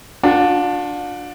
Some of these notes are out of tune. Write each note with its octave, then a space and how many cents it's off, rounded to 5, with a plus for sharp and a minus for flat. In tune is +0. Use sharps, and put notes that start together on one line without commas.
D4 +0 F4 +45 F#5 +35